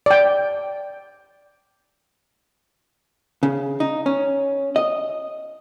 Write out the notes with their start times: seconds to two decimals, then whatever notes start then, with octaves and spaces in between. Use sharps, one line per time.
0.06 D5 G5
3.43 C#3
3.80 D#4
4.06 C#4
4.76 D#5